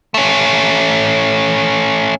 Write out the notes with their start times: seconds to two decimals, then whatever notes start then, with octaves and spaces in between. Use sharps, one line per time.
0.14 A3 C#4